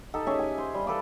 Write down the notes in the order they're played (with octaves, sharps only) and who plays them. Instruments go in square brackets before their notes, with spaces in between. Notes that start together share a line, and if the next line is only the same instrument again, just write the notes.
[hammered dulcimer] D#4 G4 A4
C#4 G4 G#4 E5
G#5
C5
G3
A4 B4 D5 F5